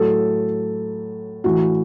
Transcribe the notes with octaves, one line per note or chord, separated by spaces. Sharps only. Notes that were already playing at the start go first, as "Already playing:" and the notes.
Already playing: A2 F#3 A4
A2 E3 F#4